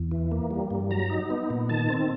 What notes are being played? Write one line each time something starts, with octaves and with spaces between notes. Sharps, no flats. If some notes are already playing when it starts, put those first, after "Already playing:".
Already playing: E2
E3
A#3
G3
G2
F#3 A#5
D#4
B3
A#2
D#3 A5
C4